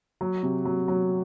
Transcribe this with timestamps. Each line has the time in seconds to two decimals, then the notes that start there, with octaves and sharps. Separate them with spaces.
0.21 F#3
0.43 C3
0.65 F#3
0.88 F#3